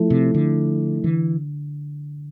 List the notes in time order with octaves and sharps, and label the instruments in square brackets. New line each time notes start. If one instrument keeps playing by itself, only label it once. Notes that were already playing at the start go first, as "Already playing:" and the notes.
Already playing: [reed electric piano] F3 A3 E4 A4
[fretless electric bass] C3
D3
[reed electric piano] D3 [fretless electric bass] E3